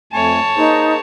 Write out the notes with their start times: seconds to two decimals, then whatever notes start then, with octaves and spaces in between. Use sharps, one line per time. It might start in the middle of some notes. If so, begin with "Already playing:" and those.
0.13 F2 A3 C#5 G#5 A5
0.56 A#3 D#4 G#4 C5